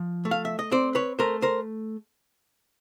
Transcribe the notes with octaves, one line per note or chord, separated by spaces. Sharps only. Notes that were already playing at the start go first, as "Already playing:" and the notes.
Already playing: F3
A3
F5
E5
D#5
C4 C5 D5
B4 C#5
A3 A#4 C5
A#4 C5